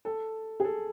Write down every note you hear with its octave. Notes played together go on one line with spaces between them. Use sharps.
A4
G#4
A4